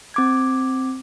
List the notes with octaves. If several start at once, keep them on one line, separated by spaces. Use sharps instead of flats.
C4 D6 G#6